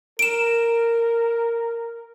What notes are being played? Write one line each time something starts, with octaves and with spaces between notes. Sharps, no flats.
A#4 D7 E7